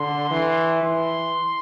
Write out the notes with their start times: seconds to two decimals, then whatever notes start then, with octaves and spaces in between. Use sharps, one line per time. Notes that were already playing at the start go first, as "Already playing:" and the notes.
Already playing: D3 C6
0.30 E3
0.83 E3 C6